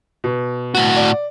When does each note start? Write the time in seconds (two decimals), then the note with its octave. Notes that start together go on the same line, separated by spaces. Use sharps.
0.24 B2
0.75 A2 F#4
0.96 D5